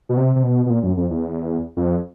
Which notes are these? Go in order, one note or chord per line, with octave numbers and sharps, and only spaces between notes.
B2
C3
C3
B2
B2
A#2
F#2
F2
E2
F2